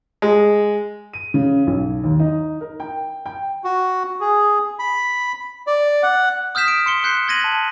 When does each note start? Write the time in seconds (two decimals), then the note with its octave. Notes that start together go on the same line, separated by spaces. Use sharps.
0.22 G#3
1.13 D#7
1.34 C#3
1.67 B1
2.04 D#2
2.19 D#4
2.61 A#4
2.80 G5
3.26 G5
3.64 F#4
4.20 G#4
4.79 B5
5.67 D5
6.03 F#5
6.55 D#6 F6 G6 B6 E7
6.68 D7
6.86 C6 C#7 G7
7.03 C6 F#6 G6 C7 C#7
7.28 C6 G#6 A#6 D#7 F#7
7.44 A5